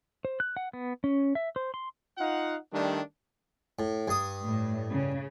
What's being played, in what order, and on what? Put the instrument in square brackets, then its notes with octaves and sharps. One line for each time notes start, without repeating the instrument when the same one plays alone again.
[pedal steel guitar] C5
F#6
F#5
B3
C#4
E5
C5
C6
[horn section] D#4 F4 F5 F#5
D#3 G3 A3 D4
[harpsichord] A2
G2 D#6
[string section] A2
C#3